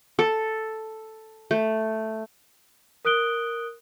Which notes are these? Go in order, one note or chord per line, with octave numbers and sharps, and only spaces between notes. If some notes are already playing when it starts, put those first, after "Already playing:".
A4
A3
A#4 D#6 F#6 D7 G7